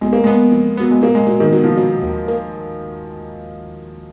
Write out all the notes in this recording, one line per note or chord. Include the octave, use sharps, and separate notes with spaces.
B1 G#3
A#3
G#3 B3
F2
F#3 B3
G#3
A#2 A#3
G#3
A#2 F#3
D#3
B2 F#3
F3
B2 F#3
D#2
A#3